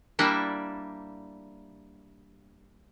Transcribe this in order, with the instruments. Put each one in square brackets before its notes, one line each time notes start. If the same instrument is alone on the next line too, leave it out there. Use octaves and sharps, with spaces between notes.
[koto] G3 A#3 D4 E4